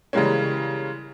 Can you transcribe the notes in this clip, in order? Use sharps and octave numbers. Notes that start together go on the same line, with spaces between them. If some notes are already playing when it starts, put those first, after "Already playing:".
C#3 E3 G3 G#3 A#3 C#4